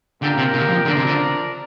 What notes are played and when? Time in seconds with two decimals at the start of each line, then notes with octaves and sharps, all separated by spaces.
0.21 A#2 D3 A#3 G4 A#4
0.38 C3
0.54 C3
0.61 D3
0.69 F3
0.86 D3 F3 D4 A#4
0.97 C3
1.07 D3